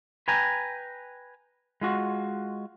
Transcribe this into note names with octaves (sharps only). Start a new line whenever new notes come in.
B4 G5 G#5 A#5
G#3 F4 F#4